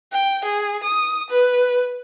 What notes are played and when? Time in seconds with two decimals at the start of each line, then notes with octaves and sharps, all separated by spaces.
0.12 G5
0.44 G#4
0.83 D#6
1.30 B4